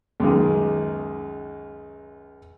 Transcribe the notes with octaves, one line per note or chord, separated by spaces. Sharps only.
C#2 F#2 D#3 G#4